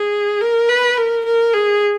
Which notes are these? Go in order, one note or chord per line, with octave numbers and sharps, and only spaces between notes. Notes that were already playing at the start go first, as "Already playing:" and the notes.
Already playing: G#4
A#4
B4
A#4
A#4
G#4